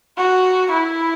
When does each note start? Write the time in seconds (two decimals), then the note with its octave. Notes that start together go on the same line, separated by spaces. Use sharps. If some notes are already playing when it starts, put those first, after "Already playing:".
0.17 F#4
0.71 E4